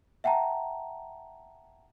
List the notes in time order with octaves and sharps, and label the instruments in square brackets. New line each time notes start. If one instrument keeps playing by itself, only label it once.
[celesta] E5 F#5 G5 A5 A#5